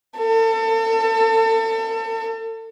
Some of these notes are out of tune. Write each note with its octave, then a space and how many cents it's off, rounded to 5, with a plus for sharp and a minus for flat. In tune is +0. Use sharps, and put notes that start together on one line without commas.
A4 +35